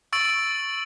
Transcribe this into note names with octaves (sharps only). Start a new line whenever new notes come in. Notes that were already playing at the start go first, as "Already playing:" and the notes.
C#6 E6 A6 D7 F#7